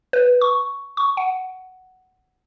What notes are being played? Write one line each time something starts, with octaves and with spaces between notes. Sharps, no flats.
B4
C#6
C#6
F#5